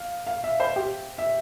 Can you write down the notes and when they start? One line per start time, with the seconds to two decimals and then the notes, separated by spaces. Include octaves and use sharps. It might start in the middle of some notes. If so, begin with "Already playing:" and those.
Already playing: F5
0.27 F5
0.44 E5
0.60 C5
0.76 G4
1.18 E5